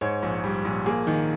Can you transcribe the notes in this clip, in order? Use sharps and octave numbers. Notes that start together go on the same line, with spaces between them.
G#2 C#5
A#1
G3
A#1
A#3 G#4
D#3